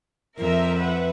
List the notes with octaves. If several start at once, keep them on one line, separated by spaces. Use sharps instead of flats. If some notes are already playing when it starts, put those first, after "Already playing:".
F2 A#4 E5 A#5
B4 E5 F#5